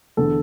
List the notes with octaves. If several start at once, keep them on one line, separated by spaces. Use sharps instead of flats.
E2 D3 A4